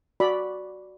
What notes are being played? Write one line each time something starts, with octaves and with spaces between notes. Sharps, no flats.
F#4 D5 B5